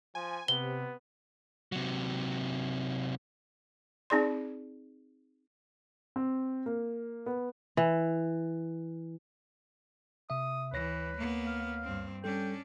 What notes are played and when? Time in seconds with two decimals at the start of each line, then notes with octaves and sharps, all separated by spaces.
0.15 F3 G#5
0.48 C3 B3 G7
1.72 C3 F#3
4.10 C4 D#4 G#4 D5 C6
6.16 C4
6.66 A#3
7.26 B3
7.77 E3
10.30 C3 E5 D#6
10.73 D2 E3 B4 C#5 A#6
11.17 A#3 B3
11.46 F5
11.84 G2 C4
12.24 G3 C#4 D4 A4 G5